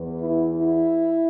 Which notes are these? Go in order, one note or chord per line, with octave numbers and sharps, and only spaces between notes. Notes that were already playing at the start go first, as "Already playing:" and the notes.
Already playing: E2 E3 B3
E4
E4